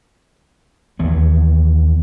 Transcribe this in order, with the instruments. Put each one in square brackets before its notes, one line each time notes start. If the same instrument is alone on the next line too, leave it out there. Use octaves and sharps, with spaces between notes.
[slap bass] D#2 E3 B3